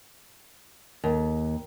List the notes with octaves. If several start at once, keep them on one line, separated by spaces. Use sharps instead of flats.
D#2